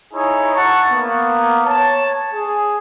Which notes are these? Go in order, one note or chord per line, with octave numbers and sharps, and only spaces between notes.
D#4 E4 G#4 C#5 A#5
F#5 A5 C#6
A#3 B3
C#5 A5
G#4